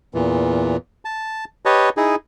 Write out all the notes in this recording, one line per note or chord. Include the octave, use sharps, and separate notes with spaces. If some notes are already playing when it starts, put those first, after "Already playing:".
E2 A#2 E3
A5
G4 B4 C#5 D#5 A5
D#4 E4 G#4